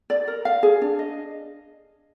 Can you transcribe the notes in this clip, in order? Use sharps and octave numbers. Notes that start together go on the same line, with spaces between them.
D5
A#4
F5
G#4
D4
D#5